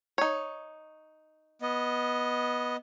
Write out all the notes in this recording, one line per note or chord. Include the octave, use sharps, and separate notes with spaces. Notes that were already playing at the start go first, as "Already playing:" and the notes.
D#4 C#5
B3 D#5